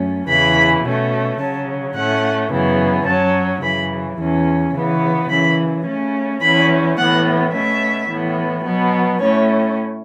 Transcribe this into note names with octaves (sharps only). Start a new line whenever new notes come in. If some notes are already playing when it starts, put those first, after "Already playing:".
Already playing: F#2 A3 C#4
E2 C#3 E3 B5
B2 A3 C#4
C#3 F#3 C#4 A5
A2 A3 C#4 F#5
F#2 C#3 E3 B3
F#2 F#3 C#4 A5
F#2 C#3 E3 B5
E2 E3 C#4
C#3 E3 B3
F#2 C#3 E3 B5
C#3 A3 C#4
E2 E3 C#4 B5
A2 E3 B3 F#5
B2 A3 C#4 E5
A2 E3 B3
B2 F#3 B3
A2 A3 C#4 C#5